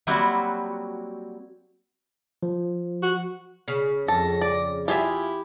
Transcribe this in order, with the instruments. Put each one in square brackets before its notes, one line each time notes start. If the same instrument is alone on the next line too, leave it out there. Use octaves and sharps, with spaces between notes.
[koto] F#3 G3 A#3 C4 E4 F#4
[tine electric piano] F3
[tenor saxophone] F#4
[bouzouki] C#3
[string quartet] F2 A#6 [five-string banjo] A4
[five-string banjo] D5
[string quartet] E4 [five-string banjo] F4 G#4 E5 [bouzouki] G4